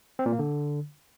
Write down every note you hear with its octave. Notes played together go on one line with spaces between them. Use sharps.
C4
A#2
A#3
D3